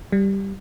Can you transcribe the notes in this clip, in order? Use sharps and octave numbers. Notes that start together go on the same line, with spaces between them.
G3